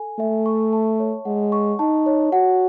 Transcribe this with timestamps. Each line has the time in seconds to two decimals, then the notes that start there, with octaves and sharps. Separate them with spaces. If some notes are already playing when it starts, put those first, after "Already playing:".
Already playing: A4 G#5
0.19 A3 E5
0.46 C#6
0.73 A5
1.00 C#5
1.25 G#3 F#5
1.52 C#6
1.79 D#4 A5
2.06 C#5
2.32 F#4 F#5